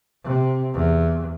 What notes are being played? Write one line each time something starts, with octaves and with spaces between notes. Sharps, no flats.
C3
E2